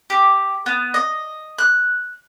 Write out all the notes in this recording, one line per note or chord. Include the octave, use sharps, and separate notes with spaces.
G4
B3
D#5
F#6